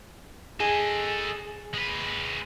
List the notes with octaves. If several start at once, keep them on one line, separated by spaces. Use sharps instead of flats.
G#4 A4 D#5
G#3 B4